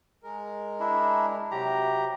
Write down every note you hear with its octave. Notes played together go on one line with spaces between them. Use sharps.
G#3 A#4
D4 E4
C3 F#3 G4 A#5